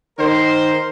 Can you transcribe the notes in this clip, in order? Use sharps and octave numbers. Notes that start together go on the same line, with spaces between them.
D#3 A#4 C5